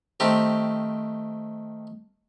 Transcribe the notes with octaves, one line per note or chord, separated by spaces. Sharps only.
D#3 A3 C4 G4